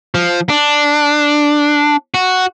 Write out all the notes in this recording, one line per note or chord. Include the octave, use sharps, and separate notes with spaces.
F3
D4
F#4